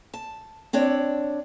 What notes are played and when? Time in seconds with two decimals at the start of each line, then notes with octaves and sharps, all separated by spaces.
0.14 A5
0.73 C4 D4 C#5 D5